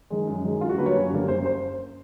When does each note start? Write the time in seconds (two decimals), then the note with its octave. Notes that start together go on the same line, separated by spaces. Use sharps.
0.10 D#3 G#3
0.27 F#2
0.44 D#3 G#3
0.61 F#2 F4
0.69 F#4
0.78 D3 G3 A#3 B4
0.86 C#5
0.95 F#2
1.12 D3 G3 A#3
1.28 F#1 C5
1.45 C5